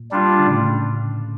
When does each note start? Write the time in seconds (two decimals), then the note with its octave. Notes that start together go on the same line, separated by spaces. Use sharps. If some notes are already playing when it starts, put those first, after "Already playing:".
Already playing: A#2
0.11 G3 D4 F4
0.39 D3
0.47 A2 C#3